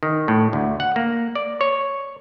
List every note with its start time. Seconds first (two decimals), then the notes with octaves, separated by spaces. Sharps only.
0.03 D#3
0.28 A2
0.53 D2
0.80 F#5
0.96 A#3
1.35 D5
1.61 C#5